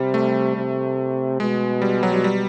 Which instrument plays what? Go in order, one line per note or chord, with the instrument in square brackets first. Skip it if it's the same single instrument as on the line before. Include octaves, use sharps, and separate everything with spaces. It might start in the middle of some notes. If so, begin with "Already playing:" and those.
Already playing: [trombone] C3 [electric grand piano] G3
[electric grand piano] A3
[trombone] C3
[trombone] B2 [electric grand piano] G#3
[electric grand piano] G3
F#3
G3
G3